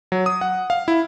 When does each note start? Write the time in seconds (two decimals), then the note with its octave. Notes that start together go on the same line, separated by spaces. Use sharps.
0.12 F#3
0.26 D#6
0.41 F#5
0.70 F5
0.88 E4